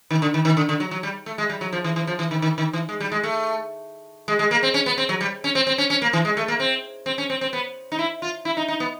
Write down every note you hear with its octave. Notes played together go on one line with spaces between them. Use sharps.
D#3
D3
D#3
D#3
D3
D3
F#3
F#3
G3
A3
G#3
G3
F#3
F3
E3
E3
F3
E3
D#3
D#3
D#3
E3
G#3
G3
G#3
A3
G#3
G#3
A#3
C4
C#4
B3
C4
F#3
G3
C#4
C4
C4
C#4
C#4
A#3
E3
G#3
A3
A#3
C4
C4
C#4
C4
C4
B3
D#4
E4
F4
E4
D#4
D#4
B3